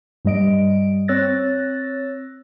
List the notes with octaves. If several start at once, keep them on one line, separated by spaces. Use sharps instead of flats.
G2 G3 D#5 D7
C4 C#5 E6 F#6 A6 A#6